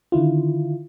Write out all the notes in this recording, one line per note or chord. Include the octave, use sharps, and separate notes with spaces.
D3 D#3 E4 F4